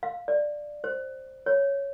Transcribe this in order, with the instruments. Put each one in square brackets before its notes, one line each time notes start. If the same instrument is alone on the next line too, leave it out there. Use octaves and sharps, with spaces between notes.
[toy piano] F5
D5
C5
C#5